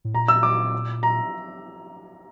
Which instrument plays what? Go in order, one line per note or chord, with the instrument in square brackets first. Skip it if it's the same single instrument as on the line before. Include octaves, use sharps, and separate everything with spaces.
[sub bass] A2
[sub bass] A#2 [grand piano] A#5
[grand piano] E6
D6
A#5